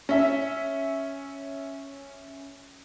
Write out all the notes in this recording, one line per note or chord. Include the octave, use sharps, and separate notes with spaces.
C#4 E5